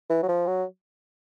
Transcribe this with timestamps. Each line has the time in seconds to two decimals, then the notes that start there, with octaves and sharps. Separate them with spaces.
0.10 E3
0.23 F#3
0.29 F3
0.47 F#3